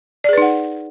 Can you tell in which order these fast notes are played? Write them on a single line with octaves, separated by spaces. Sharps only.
D5 G#4 B4 D#4 F#5